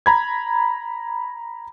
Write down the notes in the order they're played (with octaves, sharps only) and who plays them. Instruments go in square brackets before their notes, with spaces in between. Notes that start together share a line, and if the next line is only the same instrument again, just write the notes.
[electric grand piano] A#5 B5 G#6